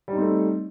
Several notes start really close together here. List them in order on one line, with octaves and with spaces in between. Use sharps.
G3 D#4 C4 A3